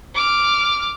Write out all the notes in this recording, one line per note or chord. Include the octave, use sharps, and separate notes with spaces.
D6 F6